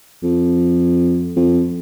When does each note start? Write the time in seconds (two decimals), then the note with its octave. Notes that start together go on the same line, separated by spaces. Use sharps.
0.23 F2
1.36 F2